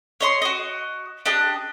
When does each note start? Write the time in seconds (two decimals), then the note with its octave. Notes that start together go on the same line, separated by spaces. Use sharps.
0.21 C#5 D#5 C6
0.42 F#4 D#5
1.26 D4 G4 D#5